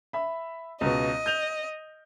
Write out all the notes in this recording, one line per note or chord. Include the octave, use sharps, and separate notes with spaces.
E5 B5
C#2 B2 D#5
G6 F7